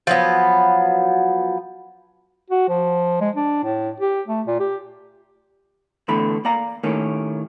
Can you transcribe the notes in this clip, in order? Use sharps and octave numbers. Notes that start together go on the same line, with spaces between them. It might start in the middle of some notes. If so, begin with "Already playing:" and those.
F3 F#3 B3
F#4
F3
G#3
D4
A2
G4
A3
A#2
G4
E2 A2 D3 A3 B5
A#3 D5 F5 A#5
D#2 A2 D#3 A3 A#3 C#4